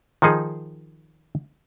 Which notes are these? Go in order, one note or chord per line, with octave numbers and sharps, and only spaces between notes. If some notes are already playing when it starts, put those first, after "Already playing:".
D#3 F3 D#4 G#4